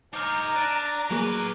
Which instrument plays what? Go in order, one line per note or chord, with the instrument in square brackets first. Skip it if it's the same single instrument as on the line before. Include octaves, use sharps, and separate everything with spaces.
[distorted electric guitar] D#4 C5 [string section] A#5 [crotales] D6 F6
[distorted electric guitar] D5 A5 [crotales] F#6 D7 [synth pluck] D#7
[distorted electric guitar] A2 B4 [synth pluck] F#3 A#3 G#4